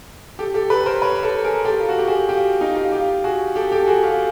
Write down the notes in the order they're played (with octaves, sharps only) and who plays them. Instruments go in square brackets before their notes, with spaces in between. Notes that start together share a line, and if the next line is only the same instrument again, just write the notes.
[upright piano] G4 A4
G4 A4
A4 B4
A#4 C5
B4 C#5
A4 B4
G#4 A#4
G4 A4
F4
F#4
G4
F#4 G#4
F4 G4
D#4 F4
F4 G4
F4 G4
F#4 G#4
G4 A4
G4 A4
F#4 G#4
F4 G4